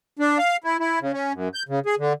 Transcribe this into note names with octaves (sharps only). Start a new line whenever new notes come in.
D4
F5
E4
E4
C#3
C#4
F#2
G6
C#3
G#4
D3